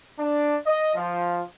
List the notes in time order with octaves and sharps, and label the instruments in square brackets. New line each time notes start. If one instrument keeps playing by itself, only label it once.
[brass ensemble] D4
D#5
F3